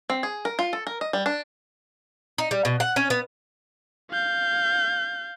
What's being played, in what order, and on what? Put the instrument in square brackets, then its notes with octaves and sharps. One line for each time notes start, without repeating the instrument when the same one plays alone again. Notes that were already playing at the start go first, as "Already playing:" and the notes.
[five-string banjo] C4
G#4
A#4
F4
A4
A#4
D#5
G3
D4
[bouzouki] D#4
G3
B2
F#5
C#4
B3
[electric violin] F5 G6